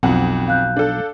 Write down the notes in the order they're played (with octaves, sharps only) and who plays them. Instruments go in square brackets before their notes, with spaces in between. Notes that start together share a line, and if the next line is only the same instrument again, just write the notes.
[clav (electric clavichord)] B1 F3 [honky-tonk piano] F2 F#5
[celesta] F5 F#6 G6
[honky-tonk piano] D4 A4